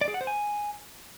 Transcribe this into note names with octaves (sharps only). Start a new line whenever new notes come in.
D5
G#4
F#5
C5
G#5